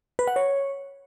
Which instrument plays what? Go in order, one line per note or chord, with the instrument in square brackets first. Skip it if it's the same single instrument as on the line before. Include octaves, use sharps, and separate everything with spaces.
[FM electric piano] B4
F#5
C#5